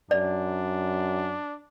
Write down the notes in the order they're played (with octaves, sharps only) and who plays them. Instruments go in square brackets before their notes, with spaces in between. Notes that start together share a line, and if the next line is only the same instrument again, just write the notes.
[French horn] F#2 [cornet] D4 [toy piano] D5